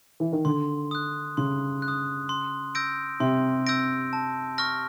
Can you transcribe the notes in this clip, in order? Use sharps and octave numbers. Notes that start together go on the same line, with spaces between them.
E3
D#3
D3 C6
D#6 F#6
C#3 C6
F#6
D#6
C6
E6 G6 A#6 D7
C3 C6
E6 G6 A#6 D7
A5
C#6 F6 A#6